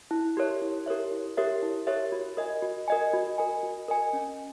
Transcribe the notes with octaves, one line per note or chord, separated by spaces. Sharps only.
E4
G4 A#4 C#5 E5
E4
G4 A#4 C#5 E5
E4
G4 A#4 C#5 E5
E4
G4 A#4 C#5 E5
F#4
A#4 D#5 G#5
F#4
A#4 D#5 G#5
F#4
A#4 D#5 G#5
F#4
A#4 D#5 G#5
C#4